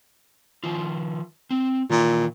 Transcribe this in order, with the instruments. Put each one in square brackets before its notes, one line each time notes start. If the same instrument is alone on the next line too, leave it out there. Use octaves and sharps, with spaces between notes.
[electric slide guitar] D#3 F3 F4
C4
[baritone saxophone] A#2 [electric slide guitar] D#3 E3